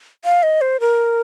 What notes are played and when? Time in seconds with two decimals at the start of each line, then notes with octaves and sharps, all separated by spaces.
0.25 F5
0.43 D#5
0.61 C5
0.80 A#4